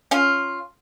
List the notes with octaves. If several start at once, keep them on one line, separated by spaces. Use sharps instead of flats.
C#4 F4